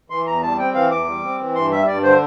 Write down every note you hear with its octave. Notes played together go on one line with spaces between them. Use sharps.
E3 C6
E2 A#5
G3 A5
C4 G5
E3 F5
E2 D6
G3
C4
E3
G2 C6
G3 E5
G2 D5
D3 C5